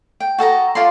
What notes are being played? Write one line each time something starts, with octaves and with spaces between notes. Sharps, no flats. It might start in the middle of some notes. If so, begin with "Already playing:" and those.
G5
F#4 A4 D#5 A#5
F4 A4 D5 C6